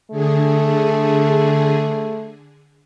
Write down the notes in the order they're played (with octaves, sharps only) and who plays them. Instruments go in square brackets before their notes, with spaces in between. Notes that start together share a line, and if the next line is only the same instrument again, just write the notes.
[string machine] D3 G#4 [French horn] A3